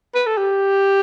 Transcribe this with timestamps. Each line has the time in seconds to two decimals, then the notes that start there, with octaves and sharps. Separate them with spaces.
0.15 B4
0.26 A4
0.37 G4